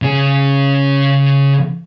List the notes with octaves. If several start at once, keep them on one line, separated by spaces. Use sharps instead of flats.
C#3 G#4